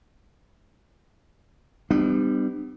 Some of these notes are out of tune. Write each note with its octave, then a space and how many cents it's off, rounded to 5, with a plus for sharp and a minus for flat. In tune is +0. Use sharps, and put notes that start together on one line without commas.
G3 +0 B3 +40 D4 +40